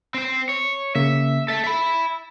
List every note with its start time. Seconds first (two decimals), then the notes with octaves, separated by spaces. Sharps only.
0.14 C4 C5
0.49 C#5
0.95 C#3 A#3 E5
1.48 A4 E5 A6
1.64 E5 B5